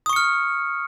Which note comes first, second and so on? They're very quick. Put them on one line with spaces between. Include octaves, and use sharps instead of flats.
D#6 C#6 C#7 F6